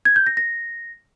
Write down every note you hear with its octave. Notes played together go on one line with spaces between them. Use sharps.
G#6
G6
A#6
A#6